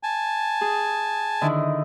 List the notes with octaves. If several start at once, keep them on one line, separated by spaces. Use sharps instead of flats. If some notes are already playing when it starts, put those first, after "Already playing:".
G#5 A5
G#4
D3 D#3 E4